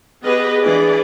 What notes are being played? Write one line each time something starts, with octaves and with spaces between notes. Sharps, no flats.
B3 G4 G#4 B4 D#5
E3 D4 G#4 D5